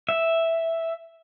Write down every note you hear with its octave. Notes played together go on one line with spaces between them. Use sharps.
E5